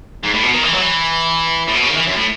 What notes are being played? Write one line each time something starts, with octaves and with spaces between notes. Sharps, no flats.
G#2
A2
B2
D#3
E3
F#3
E3
A2
B2
C#3
D#3
E3
F#2
A2